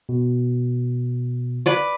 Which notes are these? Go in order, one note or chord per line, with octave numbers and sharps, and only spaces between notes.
B2
B4 D5 D6